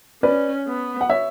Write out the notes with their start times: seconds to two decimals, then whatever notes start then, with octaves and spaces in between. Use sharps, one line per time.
0.23 C#4 B4 D5
0.67 B3
1.01 F#5
1.10 C#5 E5